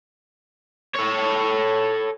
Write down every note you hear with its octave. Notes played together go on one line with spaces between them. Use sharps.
A4 C#5